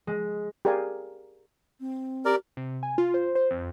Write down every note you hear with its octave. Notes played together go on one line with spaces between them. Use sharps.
G#3
G4 G#4 A#4 D5 F5 G#5
C4
G4 A#4 D5
C3
G#5
F4
C5
C5
F2